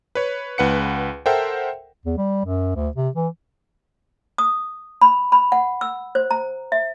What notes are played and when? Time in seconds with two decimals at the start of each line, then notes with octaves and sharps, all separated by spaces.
0.15 B4 C#5
0.58 C#2 B4 F#5 C#7
1.26 A4 A#4 C5 E5 F#5 G5
2.06 E2
2.17 G3
2.45 F#2
2.76 D2
2.96 C3
3.16 E3
4.38 D#6
5.02 B5
5.32 B5
5.52 F#5
5.81 E6
6.15 C5
6.31 A#5
6.72 E5